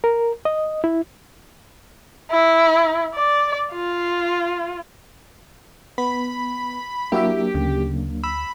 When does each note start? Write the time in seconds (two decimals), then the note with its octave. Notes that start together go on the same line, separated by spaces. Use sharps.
0.04 A#4
0.45 D#5
0.84 E4
2.31 E4
3.15 D5
3.72 F4
5.98 B3 B5
7.12 F#3 A#3 D4 E4 F#4 G4 E5
7.55 D2 C#3
8.23 B5 E6